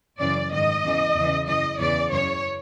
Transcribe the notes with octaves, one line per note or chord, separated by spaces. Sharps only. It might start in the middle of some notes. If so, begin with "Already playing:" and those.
F#2 C#3 E3 D5
G#2 D#3 D#5
E2 C#3 E3
E2 C#3 E3
F#2 C#3 E3 D#5
E2 C#3 E3 D5
F#2 C#3 E3 C#5